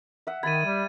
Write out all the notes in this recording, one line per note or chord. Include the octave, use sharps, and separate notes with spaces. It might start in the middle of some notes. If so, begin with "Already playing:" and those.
E5 F#5
D#3 G5 B5 G#6 A6 D#7
G3